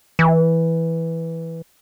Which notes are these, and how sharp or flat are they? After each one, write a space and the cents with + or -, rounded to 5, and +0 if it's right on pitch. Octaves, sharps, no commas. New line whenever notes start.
E3 -5